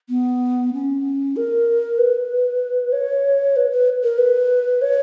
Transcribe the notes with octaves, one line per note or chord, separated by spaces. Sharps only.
B3
C#4
A#4
B4
C#5
B4
B4
A#4
B4
C#5